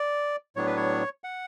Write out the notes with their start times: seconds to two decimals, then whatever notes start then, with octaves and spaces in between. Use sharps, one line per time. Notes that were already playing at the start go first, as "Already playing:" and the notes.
Already playing: D5
0.56 A2 F#3 B3 D4 C#5
0.66 B4
0.77 C#5
1.24 F#5